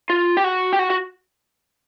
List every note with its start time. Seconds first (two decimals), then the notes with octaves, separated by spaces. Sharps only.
0.10 F4
0.37 G4
0.44 F#4
0.73 G4
0.79 F#4
0.90 F#4